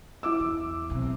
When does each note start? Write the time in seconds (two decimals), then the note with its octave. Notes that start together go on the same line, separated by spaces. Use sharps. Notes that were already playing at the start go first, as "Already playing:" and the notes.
0.23 E4 D6 E6
0.40 E2
0.90 B1 C3